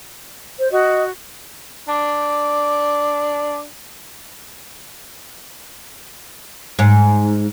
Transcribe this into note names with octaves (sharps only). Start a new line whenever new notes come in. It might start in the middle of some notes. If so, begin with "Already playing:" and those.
C5
F#4 D#5
D4 D6
G#2